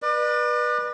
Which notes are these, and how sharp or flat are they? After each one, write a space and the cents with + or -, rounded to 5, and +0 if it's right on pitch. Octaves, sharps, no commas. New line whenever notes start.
B4 -25 D5 +35